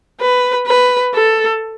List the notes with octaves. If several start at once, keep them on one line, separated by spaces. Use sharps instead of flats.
B4
B4
A4